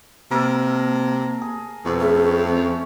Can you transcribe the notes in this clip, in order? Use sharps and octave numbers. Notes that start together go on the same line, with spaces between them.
C3 A#3 A4 A#4
G#4
F2 B2 A4
A3 C#4 G#4
C4